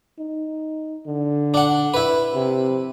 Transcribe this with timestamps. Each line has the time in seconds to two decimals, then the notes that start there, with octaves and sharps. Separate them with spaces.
0.19 D#4
1.06 D3
1.54 D4 F#5
1.94 E4 B4
2.34 C3